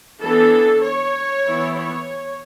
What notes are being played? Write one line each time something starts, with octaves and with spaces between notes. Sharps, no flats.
E3 B3 D4 A4
C#5
E3 B3 E4
C#5